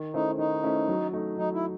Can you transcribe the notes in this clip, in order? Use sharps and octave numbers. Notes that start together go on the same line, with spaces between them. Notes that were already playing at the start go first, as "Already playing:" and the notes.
Already playing: D#3
A3 C#4 D#4 E4 C5
D#3 D#4
A3 C#4 E4 C5
F#3
A3 D#4
F#3 D#4
E4